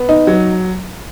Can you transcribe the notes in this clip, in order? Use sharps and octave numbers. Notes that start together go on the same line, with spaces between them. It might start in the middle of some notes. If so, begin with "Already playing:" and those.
Already playing: B3
D#4
F#3